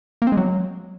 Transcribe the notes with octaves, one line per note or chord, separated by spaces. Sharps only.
A#3
C4
G#3
F#3